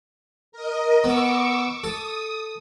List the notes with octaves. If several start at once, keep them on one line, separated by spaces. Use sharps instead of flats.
A#4 D#5
B3 C#6 D6 E6
A4 D#6